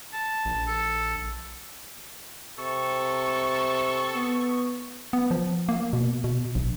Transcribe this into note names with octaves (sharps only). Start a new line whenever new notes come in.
A5
A#1
A4
C3 A4 C#6
B3
B3
F3
A#3
B2
B2
A#1